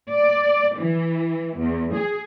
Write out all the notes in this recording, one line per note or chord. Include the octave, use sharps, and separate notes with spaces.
D5
E3
E2
G#4